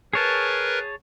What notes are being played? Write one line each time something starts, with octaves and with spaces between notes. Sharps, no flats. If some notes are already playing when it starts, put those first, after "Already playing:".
G#4 A#4 B4 C#5 A5